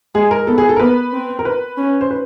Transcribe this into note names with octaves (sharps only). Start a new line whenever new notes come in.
G#3 G#4
A#4
B3 A4
G#4
A4
A#4
B3 B4
C4
A#4
B4
C#4
C5
B4